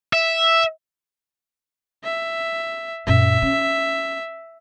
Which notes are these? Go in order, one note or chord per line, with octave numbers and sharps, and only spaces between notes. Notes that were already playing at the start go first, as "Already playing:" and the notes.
E5
E5
F#2 A#2 E5
C#4